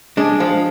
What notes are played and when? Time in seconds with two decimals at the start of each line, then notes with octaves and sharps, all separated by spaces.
0.17 G#3 D4
0.40 F3